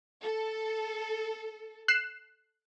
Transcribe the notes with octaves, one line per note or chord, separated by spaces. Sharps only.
A4
F#6 C7 E7